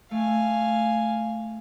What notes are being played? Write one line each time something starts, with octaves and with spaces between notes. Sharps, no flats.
A3 F5 G#5